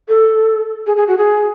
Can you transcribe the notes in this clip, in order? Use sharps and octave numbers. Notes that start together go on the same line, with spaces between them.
A4
G#4
G#4
F#4
G#4